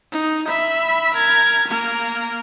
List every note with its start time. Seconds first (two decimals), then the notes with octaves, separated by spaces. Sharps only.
0.12 D#4
0.48 E5 B5
1.15 A#4 G#6
1.68 A#3 A#4